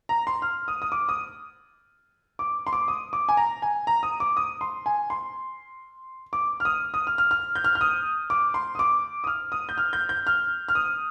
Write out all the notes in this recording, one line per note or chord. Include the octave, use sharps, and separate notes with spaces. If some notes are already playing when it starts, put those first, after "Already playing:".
A#5
C6
F6
D#6
D#6
D6
D#6
D6
C6
D6
D#6
D6
G#5
A#5
G#5
A#5
D#6
D6
D#6
C6
G#5
C6
D6
F6
D#6
D#6
F6
F6
F6
G6
F6
F6
D#6
D6
C6
D#6
D6
D#6
F6
D#6
G6
F6
G6
G6
F6
F6
D#6